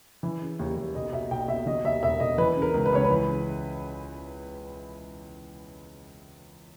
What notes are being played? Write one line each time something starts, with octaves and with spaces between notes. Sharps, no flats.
E3
C#3
D#2
D#2
B1 D#5
B2 E5
B1 G5
B2 E5
D#3 D#5
D#2 E5
E1 E5
E1 D#5
E3 B4
C#3
A#4
C#2
B4
C#2 C#5
B4
E3
C#3